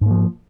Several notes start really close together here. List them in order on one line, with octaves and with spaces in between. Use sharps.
G#2 A#3 F3